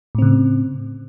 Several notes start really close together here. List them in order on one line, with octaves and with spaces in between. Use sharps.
A2 C4 C#3